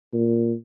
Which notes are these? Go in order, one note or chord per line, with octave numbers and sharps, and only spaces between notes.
A#2